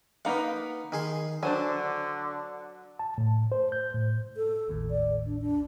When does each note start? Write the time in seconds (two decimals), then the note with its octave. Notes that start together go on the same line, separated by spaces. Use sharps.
0.25 A#3 B3 D#4 F5 F#5
0.92 D#3 G#4 C6
1.43 D3 F#3 D4 C5 G#5
2.99 A5
3.18 A2
3.52 C5
3.72 G6
3.94 A2
4.37 A4
4.68 G#1 D#2 A2
4.90 D5
5.26 D4
5.41 D4